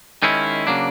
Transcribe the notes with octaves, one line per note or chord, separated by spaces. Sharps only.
D#3 G#3 C#4 E4
C#3 F#3 A#3 D4